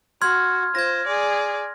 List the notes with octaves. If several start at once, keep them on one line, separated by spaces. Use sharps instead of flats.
F#4 C6 F6 G#6
F4 C5 G#6 A#6
G#4 D5